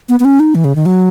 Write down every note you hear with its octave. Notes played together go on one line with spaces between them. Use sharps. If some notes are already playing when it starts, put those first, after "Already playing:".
B3
B3
C#4
D#4
E3
C#3
D#3
F#3